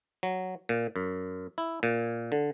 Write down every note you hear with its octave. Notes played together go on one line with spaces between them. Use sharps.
F#3
A#2
F#2
E4
A#2
D3